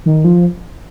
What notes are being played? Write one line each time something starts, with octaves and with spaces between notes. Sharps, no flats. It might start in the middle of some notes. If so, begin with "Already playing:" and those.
D#3
F3